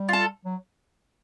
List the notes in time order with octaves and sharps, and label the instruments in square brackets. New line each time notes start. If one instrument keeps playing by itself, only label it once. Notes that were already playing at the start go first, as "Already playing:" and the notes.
Already playing: [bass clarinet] G3
[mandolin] F4 A4
[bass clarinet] F#3